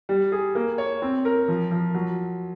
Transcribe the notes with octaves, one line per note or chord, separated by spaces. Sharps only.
G3
G#4
A#3
C#5
C4
A#4
F3
F3
F#3